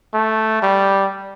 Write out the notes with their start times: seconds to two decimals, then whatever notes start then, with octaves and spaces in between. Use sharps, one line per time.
0.14 A3
0.62 G3